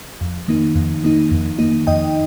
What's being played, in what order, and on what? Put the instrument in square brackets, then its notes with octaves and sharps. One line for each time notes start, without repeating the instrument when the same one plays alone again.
[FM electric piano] F2
D#3 A#3 D#4
F2
D#3 A#3 D#4
F2
D#3 A#3 D#4
F2 D#5 G5